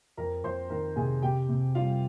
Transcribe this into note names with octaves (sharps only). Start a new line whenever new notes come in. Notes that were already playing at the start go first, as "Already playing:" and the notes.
F2 A#4 A#5
F2 C5 C6
D#3 A#4 A#5
C3 G#4 G#5
C3 G4 G5
C3
G3 F4 F5